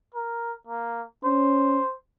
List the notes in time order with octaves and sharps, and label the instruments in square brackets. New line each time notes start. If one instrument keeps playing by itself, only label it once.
[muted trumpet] A#4
A#3
[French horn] C#4 [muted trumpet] C5